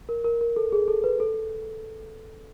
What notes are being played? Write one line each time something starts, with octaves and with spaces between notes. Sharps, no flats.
A#4
A#4
A#4
A4
G#4
A4
B4
A4